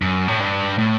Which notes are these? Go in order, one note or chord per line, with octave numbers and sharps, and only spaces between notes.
F#2
A2
G2
A2